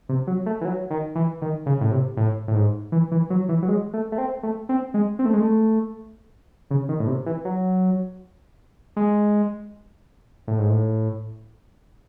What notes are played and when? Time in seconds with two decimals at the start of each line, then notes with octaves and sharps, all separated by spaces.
0.09 C3
0.27 F#3
0.46 A3
0.61 E3
0.65 F#3
0.90 D#3
1.15 E3
1.42 D#3
1.66 C#3
1.81 A2
1.92 C3
2.17 A2
2.48 A2
2.55 G#2
2.92 E3
3.12 E3
3.30 F#3
3.49 E3
3.62 F#3
3.68 G#3
3.94 A3
4.12 A3
4.18 C4
4.43 A3
4.69 C4
4.94 G#3
5.19 C4
5.25 A3
5.33 G#3
5.40 A3
6.71 C#3
6.89 D#3
6.99 A2
7.07 C3
7.26 E3
7.45 F#3
8.96 G#3
10.48 A2
10.59 G#2
10.70 A2